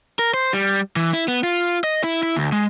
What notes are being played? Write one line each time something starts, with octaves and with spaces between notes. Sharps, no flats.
A#4
C5
G3
E3
E4
B3
F4
D#5
E4
E4
D2
G#3